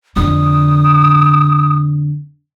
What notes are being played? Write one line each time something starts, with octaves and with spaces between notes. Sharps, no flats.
F2 D3 D#6